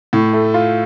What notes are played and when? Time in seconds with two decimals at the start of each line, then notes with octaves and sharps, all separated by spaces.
0.13 A2
0.33 A3
0.54 F4